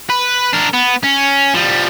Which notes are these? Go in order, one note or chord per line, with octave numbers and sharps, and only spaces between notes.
B4
D4 A#4
B3
C#4
F3 G3